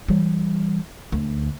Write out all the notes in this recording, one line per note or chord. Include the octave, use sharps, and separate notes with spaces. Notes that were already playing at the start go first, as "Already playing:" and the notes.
E3 G3
D2